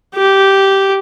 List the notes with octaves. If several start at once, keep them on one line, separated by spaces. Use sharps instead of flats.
G4